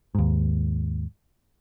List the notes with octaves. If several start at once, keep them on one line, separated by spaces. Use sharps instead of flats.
D#2 G#2